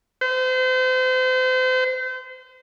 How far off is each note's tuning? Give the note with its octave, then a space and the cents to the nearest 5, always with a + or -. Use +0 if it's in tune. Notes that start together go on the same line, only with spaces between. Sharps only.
C5 -35